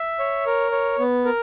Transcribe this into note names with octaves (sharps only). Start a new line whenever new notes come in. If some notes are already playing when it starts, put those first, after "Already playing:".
Already playing: E5
C#5
A#4
C#5
B3
A#4